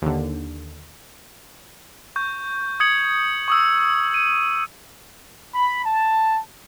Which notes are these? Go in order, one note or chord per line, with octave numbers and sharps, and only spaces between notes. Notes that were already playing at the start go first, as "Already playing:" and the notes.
D#2 D3
C#6 G6
D#6 G#6 C#7 F#7
C#6 D#6 E6
D#7
B5
A5